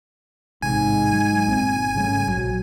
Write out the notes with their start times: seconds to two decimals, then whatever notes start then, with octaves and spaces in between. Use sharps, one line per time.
0.62 A1 G#2 C3 G#5
1.12 F#3
1.46 G1 A#2 C4
1.95 G#2 C#3 G3 A3
2.28 A#1 F#3